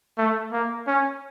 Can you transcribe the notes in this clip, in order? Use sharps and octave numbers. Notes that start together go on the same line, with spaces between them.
A3
A#3
C#4